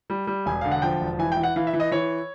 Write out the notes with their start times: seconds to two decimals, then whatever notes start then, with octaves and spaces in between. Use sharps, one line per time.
0.10 G3
0.27 G3
0.46 E1 G#5
0.61 D3 F5
0.71 F#5
0.82 F3 G5
1.01 E1
1.19 E3 G#5
1.32 G5
1.37 E3
1.43 F#5
1.56 E3 F5
1.67 E5
1.73 E3
1.80 D#5
1.91 E3 C#5